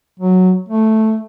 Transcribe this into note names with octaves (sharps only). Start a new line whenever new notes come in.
F#3
A3